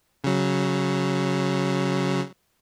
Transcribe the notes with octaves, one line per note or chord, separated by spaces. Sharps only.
C#3 F#3